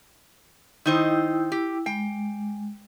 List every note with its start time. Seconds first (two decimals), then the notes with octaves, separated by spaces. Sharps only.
0.86 D#3 D#4 E4 C5 G5 E6
1.52 G4
1.86 G#3 G5